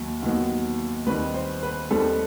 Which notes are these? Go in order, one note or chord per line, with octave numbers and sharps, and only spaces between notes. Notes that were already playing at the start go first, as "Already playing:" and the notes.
Already playing: D#2 D#3 F#3
D#2 D#3 F#3 B3
D#2 D#3 G3 C4 B4
C5
B4
D#2 D#3 G3 C4 A4